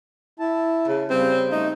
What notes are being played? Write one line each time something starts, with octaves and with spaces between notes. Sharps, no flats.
E4 A5
C#3
C#3 G3 C4
A3 D#4